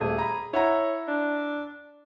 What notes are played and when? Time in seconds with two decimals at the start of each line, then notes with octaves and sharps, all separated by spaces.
0.01 D#1 A3 G#4
0.18 A#5 B5
0.53 E4 C#5 F#5 A#5
1.08 D4